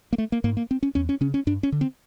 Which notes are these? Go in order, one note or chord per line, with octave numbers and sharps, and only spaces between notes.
A#3
A3
A#3
G#2 A#3
A#3
C4
C#4
E2 C#4
C#4
C#3 C#4
C#4
G2 D4
C#4
D3
C4